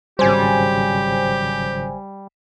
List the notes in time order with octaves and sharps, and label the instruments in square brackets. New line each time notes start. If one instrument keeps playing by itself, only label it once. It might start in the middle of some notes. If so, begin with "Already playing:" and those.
[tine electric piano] G#1 C#3 F#3 [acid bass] G3 [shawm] G4 [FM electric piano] C5 G#5